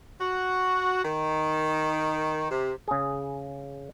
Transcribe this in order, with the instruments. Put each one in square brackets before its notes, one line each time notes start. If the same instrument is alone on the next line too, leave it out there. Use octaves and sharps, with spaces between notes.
[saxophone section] F#4
D#3
C3
[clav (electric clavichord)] C#3 G#4